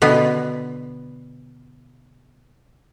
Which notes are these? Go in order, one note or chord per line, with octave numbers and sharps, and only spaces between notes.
B2 D3 B3